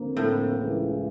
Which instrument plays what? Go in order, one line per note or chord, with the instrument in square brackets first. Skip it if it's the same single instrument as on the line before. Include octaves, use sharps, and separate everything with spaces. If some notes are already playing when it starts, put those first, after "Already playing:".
Already playing: [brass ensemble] F2 D3 F3 A#3
[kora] A2
[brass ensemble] C#2 C#3 E3